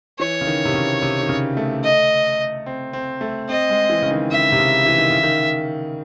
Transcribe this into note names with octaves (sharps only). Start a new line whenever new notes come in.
E3 C#5
C#3
D#3
C3
C#3
C3
D#3
C#3
A3
D#5
C4
C4
A3
C4 D#5
G#3
E3
C#3
D#3
C#3 E5
C3
C#3
E3
D#3
C#3
D#3